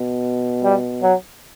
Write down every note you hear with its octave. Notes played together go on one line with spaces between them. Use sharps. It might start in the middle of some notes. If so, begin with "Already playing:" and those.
Already playing: B2
G3
F#3